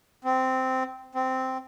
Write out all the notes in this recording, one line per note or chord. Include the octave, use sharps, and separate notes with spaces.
C4
C4